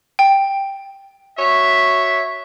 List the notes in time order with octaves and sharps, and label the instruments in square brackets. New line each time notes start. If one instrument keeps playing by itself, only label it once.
[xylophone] G5
[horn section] F#4 C#5 E5